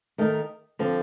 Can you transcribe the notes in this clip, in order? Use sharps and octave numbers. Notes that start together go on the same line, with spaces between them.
D#3 A3 D#4 A#4
D3 F3 C4